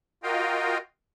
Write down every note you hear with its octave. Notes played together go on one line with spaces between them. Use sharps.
F4 F#4 A#4 D#5 F5 G5